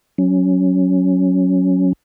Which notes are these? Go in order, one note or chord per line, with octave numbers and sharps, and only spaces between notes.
F#3 C#4